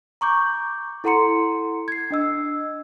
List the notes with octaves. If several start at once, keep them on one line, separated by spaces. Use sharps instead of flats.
A#5 C#6 D6 G6
E4 A4 F#5 A#5 C6 C#7
G#6 C7
D4 D#5 E6